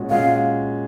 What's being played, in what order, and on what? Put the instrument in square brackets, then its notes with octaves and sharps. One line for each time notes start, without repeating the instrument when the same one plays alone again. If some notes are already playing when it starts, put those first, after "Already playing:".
Already playing: [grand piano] A#2 G#3 C#4 F#4
[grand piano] A#2 G#3 C#4 F#4 [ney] F5